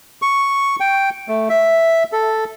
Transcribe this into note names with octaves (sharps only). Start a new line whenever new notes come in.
C#6
G5
A3
E5
A4